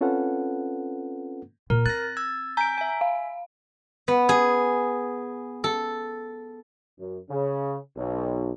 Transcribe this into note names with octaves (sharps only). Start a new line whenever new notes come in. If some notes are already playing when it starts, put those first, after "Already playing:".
C4 C#4 F4 A4 B4 F#5
A#2 A#4 A#5
C4 F#6 A6 A#6
E6 G#6
G#5 A#5 G6 B6 D7
E5 G#5
F5
B3
G#4
A4
F#2
C#3
B1